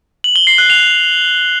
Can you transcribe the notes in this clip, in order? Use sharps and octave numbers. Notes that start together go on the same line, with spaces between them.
F#7
G7
C7
F#6
F7